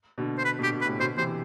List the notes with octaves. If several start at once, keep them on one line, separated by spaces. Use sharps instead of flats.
B2 D3
C5
B4
B2 D3
G4
B2
B4
A2 C3
B2 D3 C5
C3 E3 C5